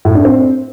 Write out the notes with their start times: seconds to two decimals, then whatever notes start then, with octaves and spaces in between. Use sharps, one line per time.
0.05 A2
0.15 D4
0.25 C4